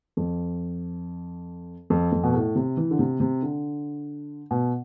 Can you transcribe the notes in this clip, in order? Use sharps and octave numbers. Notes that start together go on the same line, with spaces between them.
F2
F2
F2
B2
A2
C3
E3
D3
C3
C3
D3
B2